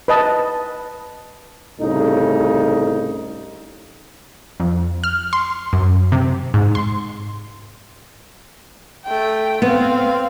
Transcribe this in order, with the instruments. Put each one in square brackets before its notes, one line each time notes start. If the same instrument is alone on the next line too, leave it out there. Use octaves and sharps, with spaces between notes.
[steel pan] B4 D#5 A5
[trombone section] C2 A2 C#3 D#4
[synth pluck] F2
F6
C6
F#2
C3
G#2
C6
[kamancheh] A3 G5
[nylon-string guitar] B3 [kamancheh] C4 F5